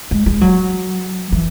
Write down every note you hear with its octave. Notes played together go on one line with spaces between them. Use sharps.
G#3
G#3
F#3
E3